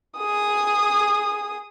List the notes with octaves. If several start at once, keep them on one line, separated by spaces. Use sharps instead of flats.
G#4 D#6